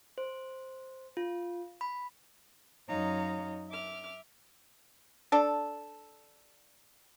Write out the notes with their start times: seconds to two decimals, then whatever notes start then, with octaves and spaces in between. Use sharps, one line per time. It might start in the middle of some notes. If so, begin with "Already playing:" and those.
0.18 C5
1.17 F4
1.81 B5
2.88 F#2 D#4 C#5 D#5 F5 A#5
3.69 E5 D6 F6
5.32 D4 A4